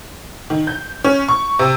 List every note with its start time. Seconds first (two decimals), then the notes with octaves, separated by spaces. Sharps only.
0.50 D#3
0.67 G6
1.04 C#4
1.28 C#6
1.59 C3